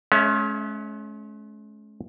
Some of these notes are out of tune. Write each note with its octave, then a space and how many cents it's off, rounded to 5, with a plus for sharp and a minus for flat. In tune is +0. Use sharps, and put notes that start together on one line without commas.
G#3 +45 C#4 +0 E5 +20